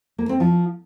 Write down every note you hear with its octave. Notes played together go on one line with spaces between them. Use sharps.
A#3
C4
F3